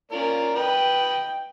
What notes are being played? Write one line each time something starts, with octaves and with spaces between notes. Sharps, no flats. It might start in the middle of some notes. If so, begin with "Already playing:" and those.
A#3 C#4 F4 A#4 D5
B4 D#5 G5